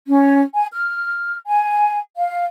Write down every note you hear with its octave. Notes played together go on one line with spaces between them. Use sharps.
C#4
G#5
F6
G#5
F5